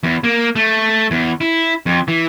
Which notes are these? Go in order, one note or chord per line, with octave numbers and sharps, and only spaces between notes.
E2
A#3
A3
E2
E4
F2
E3